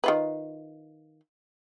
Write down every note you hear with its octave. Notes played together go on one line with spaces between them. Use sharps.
D#3 F4 B4